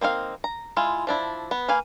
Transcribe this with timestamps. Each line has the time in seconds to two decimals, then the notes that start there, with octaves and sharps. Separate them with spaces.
0.01 A#3 C4 D#4 F5
0.44 A#5
0.77 G#3 E4 F4
1.07 F3 D4 E4
1.51 B3
1.68 A#3 B4 F5 G#5